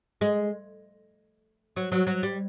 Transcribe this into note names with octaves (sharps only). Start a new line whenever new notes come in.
G#3
F#3
F#3
F#3
G3